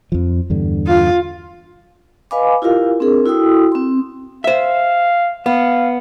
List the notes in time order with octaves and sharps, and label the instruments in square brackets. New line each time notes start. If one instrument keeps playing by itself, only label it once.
[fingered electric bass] F2 F3
E2 G2 D3
[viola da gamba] F4
[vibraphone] B4 D#5 F5 G#5 B5 D6
E4 F4 G4 A#4 F5
C4 D4 G#4 A#4
E4 F#4 A4 G5 D#6 E6
C4 C6
[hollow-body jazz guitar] C5 E5 [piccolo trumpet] F5
[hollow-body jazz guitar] B3 [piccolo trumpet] F5